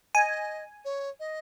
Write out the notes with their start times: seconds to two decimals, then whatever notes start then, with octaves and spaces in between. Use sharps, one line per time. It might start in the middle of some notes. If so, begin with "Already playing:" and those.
0.15 D#5 G#5
0.85 C#5
1.20 D#5